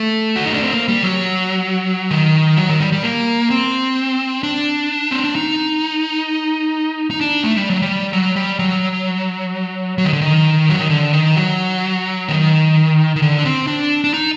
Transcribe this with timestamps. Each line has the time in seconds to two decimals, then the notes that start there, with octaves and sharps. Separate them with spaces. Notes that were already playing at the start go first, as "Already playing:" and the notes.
Already playing: A3
0.36 F#4
0.45 D#4
0.54 D4
0.63 C4
0.73 A#3
0.88 G3
1.03 F#3
2.11 D#3
2.57 F#3
2.69 D#3
2.80 G3
2.92 G3
3.03 A#3
3.50 C4
4.43 D4
5.11 C4
5.24 D4
5.35 D#4
7.11 D#4
7.21 D4
7.43 A3
7.57 G3
7.70 F#3
7.82 G3
8.13 F#3
8.36 G3
8.59 F#3
9.98 F#3
10.05 D#3
10.13 D3
10.21 D#3
10.69 F#3
10.80 D#3
10.90 D3
11.13 D#3
11.36 F#3
12.29 D#3
13.16 D#3
13.22 D3
13.39 D4
13.45 C4
13.67 D4
14.04 D4
14.14 D#4